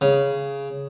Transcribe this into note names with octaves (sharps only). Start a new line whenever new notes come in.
C#3